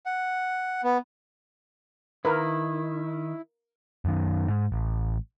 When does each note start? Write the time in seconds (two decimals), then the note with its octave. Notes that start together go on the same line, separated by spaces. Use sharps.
0.06 F#5
0.83 B3
2.25 D#3 E4 A#4 B4
4.05 F#2 D#3
4.48 G#2
4.72 A1